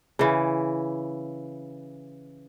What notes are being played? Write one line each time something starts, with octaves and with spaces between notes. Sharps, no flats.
C#3 E3